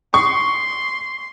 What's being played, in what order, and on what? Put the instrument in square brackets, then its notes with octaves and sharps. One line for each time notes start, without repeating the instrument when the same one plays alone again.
[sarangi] C6 [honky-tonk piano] C#6